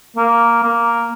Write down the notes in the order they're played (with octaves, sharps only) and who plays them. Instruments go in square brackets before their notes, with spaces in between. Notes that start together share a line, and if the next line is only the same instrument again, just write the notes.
[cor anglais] A#3
A#3